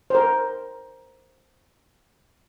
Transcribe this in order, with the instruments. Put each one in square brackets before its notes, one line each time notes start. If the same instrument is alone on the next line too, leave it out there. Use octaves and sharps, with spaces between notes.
[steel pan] A#4 C5